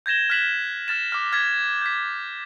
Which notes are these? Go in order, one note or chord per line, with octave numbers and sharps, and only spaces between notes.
G6 G#6 A#6 E7 G7
F6 F#6 B6 E7 F#7
F6 A6 E7
D6 F6
F6 G#6 A6 B6
G6 B6